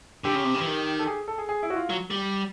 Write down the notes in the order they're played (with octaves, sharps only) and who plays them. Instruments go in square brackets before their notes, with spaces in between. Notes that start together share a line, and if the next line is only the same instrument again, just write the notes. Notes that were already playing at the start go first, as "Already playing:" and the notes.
[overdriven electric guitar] D3 [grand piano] G4
[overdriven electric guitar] C#3
C3
C#3
E3
D#3
[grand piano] A4
G#4
A4
G#4
G#4
E4
F#4
F4
[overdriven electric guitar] F#3
G3